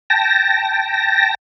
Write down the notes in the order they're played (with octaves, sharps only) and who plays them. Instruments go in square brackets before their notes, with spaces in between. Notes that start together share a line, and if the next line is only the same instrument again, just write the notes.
[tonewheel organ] G5 A5 A#6